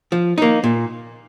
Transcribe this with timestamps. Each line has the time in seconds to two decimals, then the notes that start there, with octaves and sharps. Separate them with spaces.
0.12 F3
0.38 A#3 D#4
0.64 A#2